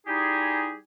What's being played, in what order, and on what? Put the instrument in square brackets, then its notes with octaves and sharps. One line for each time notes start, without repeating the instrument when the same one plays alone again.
[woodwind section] G3 D#4 E4 G4 G#4